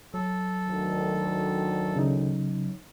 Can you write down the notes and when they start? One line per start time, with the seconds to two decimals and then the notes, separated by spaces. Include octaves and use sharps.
0.14 F#3 A4
0.69 D2 D#3
1.96 C#3 D#4